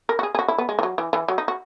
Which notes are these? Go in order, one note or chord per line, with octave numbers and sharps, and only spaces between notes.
A#4
F#4
G#4
G#4
F#4
E4
B3
G#3
E3
F#3
E3
E3
F#3
D#4
F#4